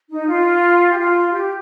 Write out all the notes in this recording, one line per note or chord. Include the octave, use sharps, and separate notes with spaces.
D#4
F4
G4
F4
G4